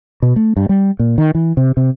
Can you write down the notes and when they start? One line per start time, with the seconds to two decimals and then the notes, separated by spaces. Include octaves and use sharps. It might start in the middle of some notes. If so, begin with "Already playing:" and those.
0.22 B2
0.36 A3
0.57 G2
0.69 G3
0.99 A#2
1.18 D#3
1.35 E3
1.57 C3
1.77 C3